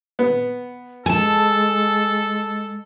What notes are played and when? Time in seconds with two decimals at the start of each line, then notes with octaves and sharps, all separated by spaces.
0.19 B3
1.06 G#3 A4 G#5 A5